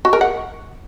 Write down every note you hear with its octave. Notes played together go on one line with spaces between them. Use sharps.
F#4
A#4
F#5